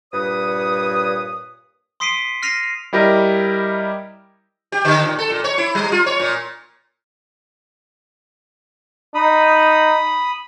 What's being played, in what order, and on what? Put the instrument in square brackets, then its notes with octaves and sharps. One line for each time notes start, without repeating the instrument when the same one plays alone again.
[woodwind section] G2 A#2 B4 C#5 D#6
[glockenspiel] C6 D#6 B6 C7 D7 D#7
F6 A#6 C7 D#7 F7
[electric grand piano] G3 E4 G4 A#4 D#5
[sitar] G4
D3
A#2
A4
A#2
C#5
E4
G3
F4
C#5
A#2
[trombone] D#4 [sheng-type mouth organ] B5 D#6